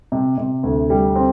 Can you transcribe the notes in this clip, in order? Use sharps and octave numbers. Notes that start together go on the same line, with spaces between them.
C3
C3
D2
G3
C4